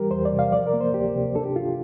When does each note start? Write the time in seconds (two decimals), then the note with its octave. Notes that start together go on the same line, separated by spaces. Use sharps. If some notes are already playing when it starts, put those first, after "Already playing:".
Already playing: E3 G3 G4 A#4
0.11 E2 C5
0.25 D5
0.32 C3
0.39 F5
0.52 F3 D5
0.67 A#4
0.74 A#3
0.81 C5
0.94 D2 G4
1.15 C3
1.35 D4 A4
1.46 G4
1.56 F4